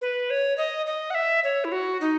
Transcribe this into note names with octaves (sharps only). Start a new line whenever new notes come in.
B4
C#5
D#5
D#5
F#5
E5
C#5
E4
F#4
D#4